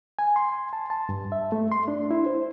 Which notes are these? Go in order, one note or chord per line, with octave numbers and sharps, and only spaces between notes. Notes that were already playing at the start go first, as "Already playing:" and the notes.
G#5
C6
A5
A5
G2
E5
A3
C6
D4
E4
C5